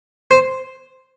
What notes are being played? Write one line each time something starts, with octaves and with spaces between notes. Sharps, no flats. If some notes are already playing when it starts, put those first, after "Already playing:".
C5